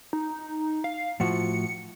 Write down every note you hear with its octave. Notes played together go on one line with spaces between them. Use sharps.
D#4
F5
A2 F3 F#4 C#7